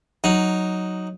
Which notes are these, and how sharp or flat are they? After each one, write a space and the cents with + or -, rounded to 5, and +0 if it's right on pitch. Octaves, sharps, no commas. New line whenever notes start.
F#3 +0 D#4 +0